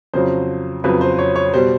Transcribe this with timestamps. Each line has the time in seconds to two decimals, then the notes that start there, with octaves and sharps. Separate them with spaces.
0.14 F2 C#3 F#3 C5
0.84 F2 C#3 F#3 B4
1.01 C5
1.19 C#5
1.36 C#5
1.53 B2 G3 C5